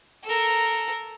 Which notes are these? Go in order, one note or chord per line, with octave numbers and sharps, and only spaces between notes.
A4 A#4